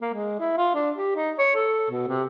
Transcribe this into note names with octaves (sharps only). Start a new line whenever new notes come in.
A#3
G#3
E4
F4
D4
G4
D#4
C#5
A4
B2
C3